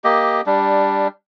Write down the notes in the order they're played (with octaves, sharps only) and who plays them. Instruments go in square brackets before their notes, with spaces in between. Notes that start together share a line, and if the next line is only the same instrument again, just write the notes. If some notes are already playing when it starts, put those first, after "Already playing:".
[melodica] A#3 G4 D#5
G3 D4